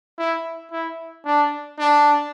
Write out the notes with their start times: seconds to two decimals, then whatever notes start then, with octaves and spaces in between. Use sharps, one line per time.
0.19 E4
0.72 E4
1.26 D4
1.79 D4